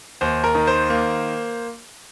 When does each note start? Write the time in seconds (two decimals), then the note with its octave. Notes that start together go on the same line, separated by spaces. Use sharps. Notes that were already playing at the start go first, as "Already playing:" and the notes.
0.21 D#2 C5
0.44 A#4
0.55 D#3
0.67 C5
0.90 A#3